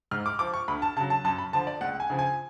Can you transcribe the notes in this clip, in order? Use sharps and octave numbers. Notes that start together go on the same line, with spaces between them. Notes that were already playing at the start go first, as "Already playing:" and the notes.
G#2 F6
D6
F3 D6
C#6
D2 B5
A5
C#3 F#3 A5
A5
F#2 A5
B5
D3 F3 A5
D5
C#2 F#5
G#5
C#3 F3
G#5